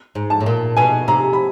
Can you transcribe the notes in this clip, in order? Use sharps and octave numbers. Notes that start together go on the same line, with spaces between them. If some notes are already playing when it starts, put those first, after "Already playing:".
G#2
A5
A2
A#2
B2 G#5
C3 A#5
B5